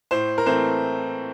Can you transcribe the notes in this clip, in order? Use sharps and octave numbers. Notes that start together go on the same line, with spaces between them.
A2 C5
A#4
E3 A3 C4 C5